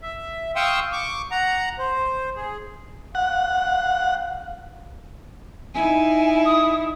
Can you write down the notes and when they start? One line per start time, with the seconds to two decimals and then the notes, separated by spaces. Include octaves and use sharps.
0.02 E5
0.56 F5 G5 C6 C#6 D#6 E6
0.92 C#6 D6
1.31 F#5 A#5
1.79 C5
2.36 G#4
3.15 F5 F#5
5.74 D#4 E4 G#5
6.45 D#6